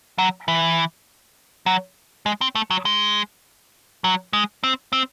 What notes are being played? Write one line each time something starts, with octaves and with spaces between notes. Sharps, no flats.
F#3
E3
F#3
G#3
C4
A3
F#3
G#3
F#3
G#3
C4
C4